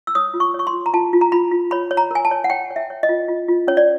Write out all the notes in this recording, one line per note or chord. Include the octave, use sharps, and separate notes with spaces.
E6
C#5 D#6
F4
C#6
C#5 C#6
C6
F4
A#5
F4 A5
F4
A#5
F4 B5
F4
C#5 B5
C#5
A#5
A#4 G#5
A5
C#5
F#5
C#5 G5
C#5
E5
C#5
D#5
F4
F4
F4
C#4 C#5
D5